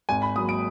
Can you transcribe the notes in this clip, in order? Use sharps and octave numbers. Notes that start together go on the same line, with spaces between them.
G#1 G#5
B5
G#2 F#3 A#3 D#6
D7